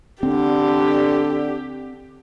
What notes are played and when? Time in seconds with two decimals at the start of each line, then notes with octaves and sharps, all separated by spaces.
0.23 D3 C4 G4